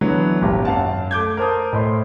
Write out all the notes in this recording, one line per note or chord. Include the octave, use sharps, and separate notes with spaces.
D3 E3 F#3 G#3 B3
D#1 G#1 A#2 G4 A5 A#5
F#2 F5 F#5 A5
A3 D6 G6 G#6
A#4 C5 A5 D#6
A2 A3 C5 D#5 C6